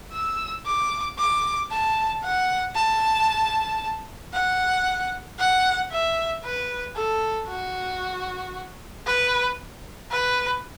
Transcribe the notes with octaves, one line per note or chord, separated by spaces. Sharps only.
E6
D6
D6
A5
F#5
A5
F#5
F#5
E5
B4
A4
F#4
B4
B4